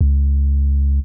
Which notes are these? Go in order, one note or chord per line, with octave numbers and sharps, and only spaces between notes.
C#2